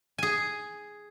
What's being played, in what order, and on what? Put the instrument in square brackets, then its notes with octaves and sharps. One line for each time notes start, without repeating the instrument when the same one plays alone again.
[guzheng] G#4 G#5